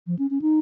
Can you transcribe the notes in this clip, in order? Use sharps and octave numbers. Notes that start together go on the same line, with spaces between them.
F3
C#4
C#4
D#4